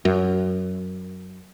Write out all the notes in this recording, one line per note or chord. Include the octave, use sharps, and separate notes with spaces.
F#2